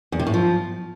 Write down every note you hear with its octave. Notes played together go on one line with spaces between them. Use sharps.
E2
C3
A2
F3